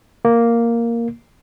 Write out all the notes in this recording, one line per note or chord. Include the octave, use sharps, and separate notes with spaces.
A#3